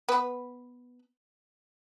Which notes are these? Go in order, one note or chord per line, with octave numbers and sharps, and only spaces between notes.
B3 B4